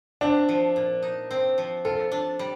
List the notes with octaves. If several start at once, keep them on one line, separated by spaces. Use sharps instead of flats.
C4 D4
F3
A#2
D#4
C4
F3
F4 A4
D4
G3